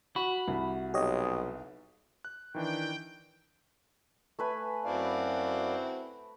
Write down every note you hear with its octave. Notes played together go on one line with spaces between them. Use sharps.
F#4 B5
C2
B1 G4 C#5 D#5
F#6
D#3 E3 D4 G5
A3 B4 G#5
F#2 C4 E4 F#4 D5 F5